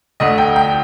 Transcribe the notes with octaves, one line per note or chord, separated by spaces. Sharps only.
D2 D3 A3 D#5
G5
G5